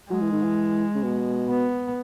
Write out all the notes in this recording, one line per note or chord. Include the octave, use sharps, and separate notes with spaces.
F#3 G#3
E3
D#3
E3
C#3
B2
B3